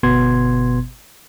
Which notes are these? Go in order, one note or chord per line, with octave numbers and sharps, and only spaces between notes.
G1 B2 B3 C6 G#6